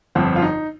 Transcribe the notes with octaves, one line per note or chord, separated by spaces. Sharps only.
G1 F2 F3 C4
F4
D#4